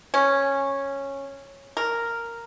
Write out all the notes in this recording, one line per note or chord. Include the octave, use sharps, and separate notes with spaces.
C#4
A#4